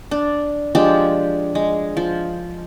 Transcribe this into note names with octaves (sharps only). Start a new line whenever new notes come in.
D4
F3 G#3 D4 G4
G#3
F3